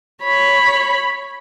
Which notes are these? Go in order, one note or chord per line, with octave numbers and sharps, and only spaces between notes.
C#5 B5